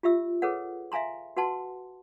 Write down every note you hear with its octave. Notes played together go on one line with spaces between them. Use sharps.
F4 G4 E5 E6
G#4 A4 B4 C#5 F#5
E5 F5 G#5 A#5 C6
F#4 B4 F#5 A5 C6